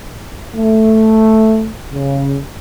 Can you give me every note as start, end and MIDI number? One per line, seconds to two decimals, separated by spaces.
0.56 1.69 57
1.92 2.37 49